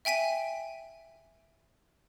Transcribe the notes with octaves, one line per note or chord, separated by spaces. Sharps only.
E5 G5 G#5 B6 D#7